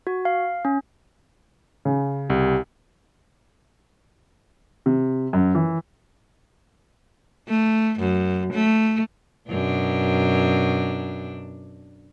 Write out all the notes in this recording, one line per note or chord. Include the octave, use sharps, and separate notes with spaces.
F#4
F5
C#4
C#3
C2 G4
C3
F#2
E3
A3
F#2
A3
F#2 B2 D4